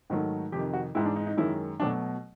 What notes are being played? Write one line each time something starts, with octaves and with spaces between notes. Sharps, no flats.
G#2 D#3 F#3 A3
F2 C3 D#3 G4
F#4
G#2 E3 G#3 E4
D4
D#4
D#4
F#2 D#3 G#3 E4
B2 F#3 A3 D4